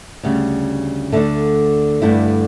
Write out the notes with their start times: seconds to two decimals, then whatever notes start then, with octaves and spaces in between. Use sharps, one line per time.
0.23 D2 C#3 G3
1.12 D2 D3 A3
2.02 G2 D3 A3 E4